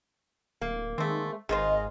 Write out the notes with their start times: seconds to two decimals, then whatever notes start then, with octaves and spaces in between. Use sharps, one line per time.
0.61 D1 A#3
0.98 D#3 G#3 A3 C4
1.49 G#1 D#3 F4 G#4 C5 D#5